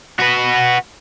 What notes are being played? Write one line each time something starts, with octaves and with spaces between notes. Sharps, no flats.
F#4 B4